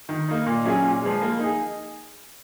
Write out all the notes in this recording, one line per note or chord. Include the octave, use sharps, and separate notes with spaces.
D#3
A#3 D#4
A#2
F#3 C#4 G#4
A#2
F3 G#3
A#3
D#4 G#4